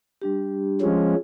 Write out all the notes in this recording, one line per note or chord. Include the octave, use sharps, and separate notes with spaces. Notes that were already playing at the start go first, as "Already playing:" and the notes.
G3 D4 G4
F3 G#3 C#4